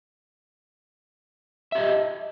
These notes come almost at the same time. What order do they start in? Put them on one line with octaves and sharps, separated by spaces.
E5 G4 D#5